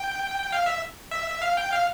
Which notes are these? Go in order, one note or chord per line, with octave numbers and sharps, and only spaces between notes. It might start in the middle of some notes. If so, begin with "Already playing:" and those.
Already playing: G5
F5
E5
E5
F5
G5
F5